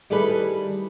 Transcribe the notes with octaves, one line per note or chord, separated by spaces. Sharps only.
D#3 G3 E4 G#4 A4 B4